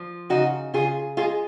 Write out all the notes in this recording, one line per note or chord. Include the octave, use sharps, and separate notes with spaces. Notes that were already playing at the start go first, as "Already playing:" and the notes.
Already playing: F3
C#3 D#4 F#4
C#3 F4 G#4
G#3 F4 G#4